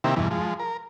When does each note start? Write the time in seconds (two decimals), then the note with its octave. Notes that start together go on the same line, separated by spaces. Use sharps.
0.04 C3 D#3 A#3 C4 E4 G4
0.16 E2 G2 B2 E3
0.31 F3 G#3
0.60 A#4